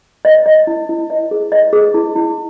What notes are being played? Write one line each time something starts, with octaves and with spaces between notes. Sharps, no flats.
D#5
D#5
E4
E4
D#5
G#4
D#5
G#4
E4
E4